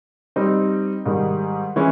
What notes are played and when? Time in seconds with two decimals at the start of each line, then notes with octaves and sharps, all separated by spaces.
0.36 G3 C4 D#4
1.06 G#2 D#3 G3
1.76 E3 G#3 C#4 E4